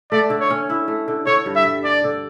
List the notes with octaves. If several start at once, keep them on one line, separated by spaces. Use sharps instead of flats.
A3 D5
D3
C#5
C#4
E4
A3
D3
D3 C#5
G2
E5
G3
D4 D5
D3